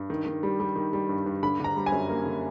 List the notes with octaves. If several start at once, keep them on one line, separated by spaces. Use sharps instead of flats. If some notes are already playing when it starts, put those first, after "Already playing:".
Already playing: G2
D#3
D#3
G3
G3
D#3
G3
G2
G2
D3 B5
D3 A#5
G3
G#5
F#2
A#3
D3